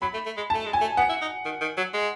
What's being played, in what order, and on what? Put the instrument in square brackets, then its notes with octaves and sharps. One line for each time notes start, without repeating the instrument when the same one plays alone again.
[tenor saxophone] F#3 [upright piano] B5
[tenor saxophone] A3
A3
G#3
[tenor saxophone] A3 [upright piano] A5
[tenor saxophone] G#3
[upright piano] G#5
[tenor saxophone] A3
[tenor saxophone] B3 [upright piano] F#5
[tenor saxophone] E4
D#4
D#3
D#3
F#3
G#3